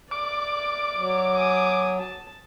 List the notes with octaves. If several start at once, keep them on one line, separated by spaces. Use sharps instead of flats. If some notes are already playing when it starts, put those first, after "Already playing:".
D5 D6
F#3
G#5 D#6
A5